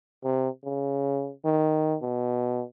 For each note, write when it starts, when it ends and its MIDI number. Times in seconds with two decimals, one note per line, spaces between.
0.24 0.49 48
0.64 1.32 49
1.45 1.97 51
2.02 2.64 47